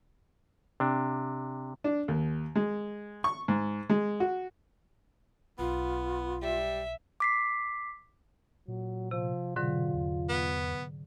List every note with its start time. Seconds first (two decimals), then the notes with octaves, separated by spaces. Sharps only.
0.80 C3 D4
1.84 D4
2.08 D#2
2.55 G#3
3.24 C#6
3.48 G#2
3.90 G#3
4.20 F#4
5.59 B1 B3 F4
6.42 G3 E5
7.20 D6 B6 C7
8.68 A#2 F#3
9.11 C3 F3
9.56 G#2 B2 D3 F#3 F4
9.94 E2
10.29 B3